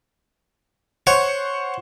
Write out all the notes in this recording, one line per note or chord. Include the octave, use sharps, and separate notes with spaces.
C5 C#5 F#5 C#6